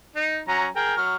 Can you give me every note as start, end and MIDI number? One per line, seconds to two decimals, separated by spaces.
0.16 0.40 63
0.48 0.67 54
0.48 0.67 61
0.48 0.67 82
0.76 0.96 68
0.76 0.96 70
0.76 0.96 79
0.97 1.16 54
0.97 1.16 89